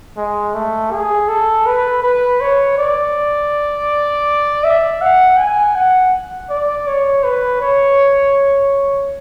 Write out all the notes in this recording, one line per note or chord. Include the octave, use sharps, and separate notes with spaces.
G#3
A3
G#4
A4
B4
B4
C#5
D5
E5
F#5
G#5
F#5
D5
C#5
B4
C#5